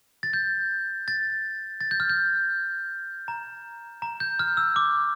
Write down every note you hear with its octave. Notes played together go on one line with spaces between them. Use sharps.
A6
G6
A6
A6
G6
F6
G6
A#5
A#5
G6
F6
E6
D6